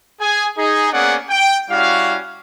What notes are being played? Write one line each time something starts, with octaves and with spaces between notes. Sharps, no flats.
G#4 G#5
D#4 G#4
A#3 B3 C#4 G#4 D5 F#5
G5
G3 C#4 E4 F#4 F5